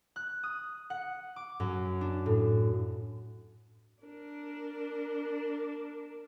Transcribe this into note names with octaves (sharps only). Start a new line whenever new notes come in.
F#6
D#6
F#5
D6
F#2
D4
A2
D4 A#4